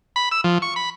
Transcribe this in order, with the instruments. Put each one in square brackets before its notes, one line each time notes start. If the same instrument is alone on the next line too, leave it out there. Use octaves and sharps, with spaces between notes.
[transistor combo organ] B5
E6
F3
C#6
B5